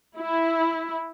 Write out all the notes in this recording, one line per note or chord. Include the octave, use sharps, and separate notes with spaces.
E4